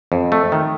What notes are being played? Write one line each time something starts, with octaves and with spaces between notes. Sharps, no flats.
F2
A3
D#3